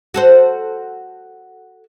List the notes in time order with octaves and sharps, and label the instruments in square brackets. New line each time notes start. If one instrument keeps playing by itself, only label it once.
[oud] F#4 A4 C5